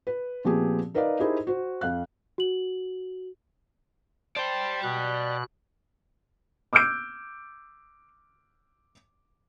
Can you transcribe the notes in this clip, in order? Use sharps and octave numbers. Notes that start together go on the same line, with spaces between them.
B4
A#2 F3 B3 C4 G4 G#4
D#4 A#4 B4 D5 D#5 F5
D#4 E4 G4 G#4 A#4 C5
F#4 C5
F2 F5 F#6
F#4 F#7
C5 D5 G5 A5
B2 F#6
D6 E6 F6 G6 D7